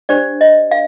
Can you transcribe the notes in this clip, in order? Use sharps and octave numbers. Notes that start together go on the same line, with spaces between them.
D4 G4 C5 D5
D#5
F5